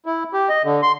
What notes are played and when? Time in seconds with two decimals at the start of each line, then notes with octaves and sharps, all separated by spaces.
0.06 E4
0.33 G4
0.49 D#5
0.64 D3
0.83 C6